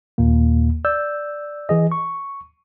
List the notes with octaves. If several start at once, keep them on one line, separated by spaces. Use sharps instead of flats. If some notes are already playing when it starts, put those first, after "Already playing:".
D#2 A#2 A#3
D5 E6 G6
E3 G#4 D#5
C#6